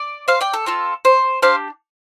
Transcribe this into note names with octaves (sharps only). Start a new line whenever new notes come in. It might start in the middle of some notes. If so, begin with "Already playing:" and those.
Already playing: D5
C5 F5
D5 G5
A4
C4 F4 A4
C5
D4 G4 C5 F5